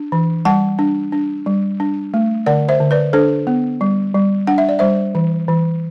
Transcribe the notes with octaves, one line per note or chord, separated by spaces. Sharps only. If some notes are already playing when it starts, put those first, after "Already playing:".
Already playing: D4
E3
G3 F#5 A5
D4
D4
G3
D4
A3
D3 D5 F#5
C5 E5
D3
B4 D5
D4 A4 C5
B3
G3
G3
D4 F#5
E5
D5
G3 C5 E5
E3
E3